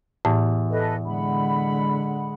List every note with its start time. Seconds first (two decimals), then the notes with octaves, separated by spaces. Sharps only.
0.25 E2 A2
0.71 A4 B4 D#5
1.05 D3 G#3 F#5 B5